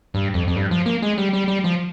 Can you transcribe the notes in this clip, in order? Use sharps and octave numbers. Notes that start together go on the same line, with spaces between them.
G2
F2
F2
G2
F3
A#3
G#3
G3
G3
G3
F3